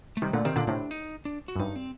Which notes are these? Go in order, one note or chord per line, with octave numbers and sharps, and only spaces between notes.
A3
C3 D#3 G3
A#2 D3 A3
C3 D#3 C4
A#2 D3 D4
A2 C3 D4
D#4
D4
F#4
F#2
G2 D#4
C4